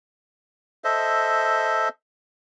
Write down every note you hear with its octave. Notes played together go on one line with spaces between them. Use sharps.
A4 C5 D#5 E5